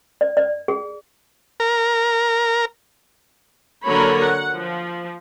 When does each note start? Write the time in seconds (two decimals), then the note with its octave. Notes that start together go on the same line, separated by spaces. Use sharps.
0.21 D5
0.37 D5
0.68 G#4
1.60 A#4
3.84 D3 F#3 A#3 A#4 C#5 B5
4.20 F#5
4.53 F3